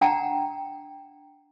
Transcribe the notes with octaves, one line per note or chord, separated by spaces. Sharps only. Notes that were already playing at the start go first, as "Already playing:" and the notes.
D4 F#5 G5 A5 A#5